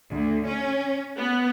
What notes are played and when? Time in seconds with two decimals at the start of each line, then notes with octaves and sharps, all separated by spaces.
0.11 D2
0.46 C#4
1.18 B3